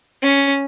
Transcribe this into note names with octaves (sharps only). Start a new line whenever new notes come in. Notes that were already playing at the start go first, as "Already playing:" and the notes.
C#4